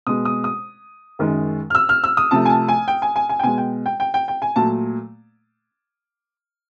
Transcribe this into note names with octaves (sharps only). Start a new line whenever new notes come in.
B2 G#3 D#6
D#6
D#6
F#2 D#3 G#3
F6
E6
F6
E6
D#6
C3 F3 A3 A5
G#5
A5
G#5
G5
G#5
G#5
G#5
G5
B2 G#3 G#5
G5
G5
G5
G5
G5
G#5
A#2 F#3 A3 A5